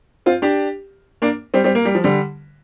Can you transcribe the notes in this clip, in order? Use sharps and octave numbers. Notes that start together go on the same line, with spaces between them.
C4 F4
D4 G4
A#3 D4
G3 C4
G3 C4
A#3
G3
F3
D3 G3